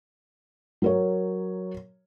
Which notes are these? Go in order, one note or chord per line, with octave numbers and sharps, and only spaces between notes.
F#3 A#4 C#5